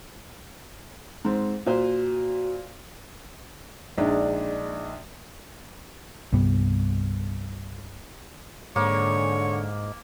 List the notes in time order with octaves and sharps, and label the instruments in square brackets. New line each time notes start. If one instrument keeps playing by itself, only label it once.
[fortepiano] G#2 C4
[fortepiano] A#2 C5 [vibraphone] F#4
[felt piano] A#1 G#3 D4 D#4
[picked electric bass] C2 G2 G3 B3
[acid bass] G#2 [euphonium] D3 [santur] A#3 [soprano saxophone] C#5